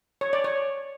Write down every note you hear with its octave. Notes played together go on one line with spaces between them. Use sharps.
C#5
D5
C#5